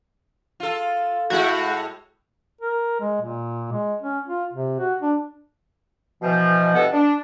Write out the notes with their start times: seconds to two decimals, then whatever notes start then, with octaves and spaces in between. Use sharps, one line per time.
0.60 F4 A4
1.30 A2 G#3 E4 F#4
2.61 A#4
3.00 G#3
3.21 A#2
3.72 G#3
4.02 C#4
4.28 F4
4.53 C3
4.79 F#4
5.02 D4
6.22 B2 E3 F3
6.74 G2 B2 E3 B3 A4 F#5
6.92 D4